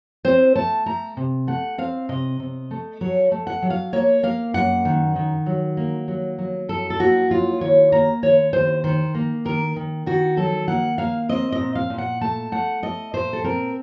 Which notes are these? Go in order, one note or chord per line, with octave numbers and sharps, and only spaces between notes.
C4 C5
A3 A5
A3 A#5
C3
A3 F#5
C4 F5
C3 D#5
C3
A3
F#3 C#5
A3
F#5
F#3
F5
A#3 C#5
A#3 F5
F#2 F#5
D#3
D#3
F#3
A#3
F#3
F#3
F#2 A4
A4
A#3 F#4
F#3 F4
D#2 C#5
A#3 A#5
D#2 C#5
D#2 C5
D#3 C5
A#3
D#3 A#4
D#3
D#3 F#4
F#3 A4
A#3 F#5
A#3 F5
C4 D#5
D#5
A#2
F5
A#2
F#5
A3 A5
A3 F#5
A3 D#5
A#2 C5
A4
C4 A#4